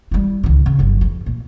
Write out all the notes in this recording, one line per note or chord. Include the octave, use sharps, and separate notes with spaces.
G3 E4
C#2 D#3
C#3
G1 F#3
F2
A#2